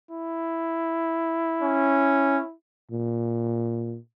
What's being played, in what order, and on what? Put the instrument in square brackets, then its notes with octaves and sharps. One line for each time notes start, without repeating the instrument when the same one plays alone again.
[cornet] E4
[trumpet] C#4
[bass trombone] A#2